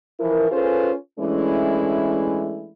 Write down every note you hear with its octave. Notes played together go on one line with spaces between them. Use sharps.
E3 F3 E4 A#4
C#4 F4 G#4 A4 B4 C5
E3 G#3 A3 C#4 D4 E4